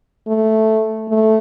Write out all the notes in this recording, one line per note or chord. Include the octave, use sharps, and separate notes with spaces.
A3
A3